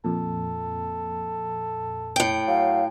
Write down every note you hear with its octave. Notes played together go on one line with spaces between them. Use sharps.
F2 A#2 A4
A2 G5
F#3 F5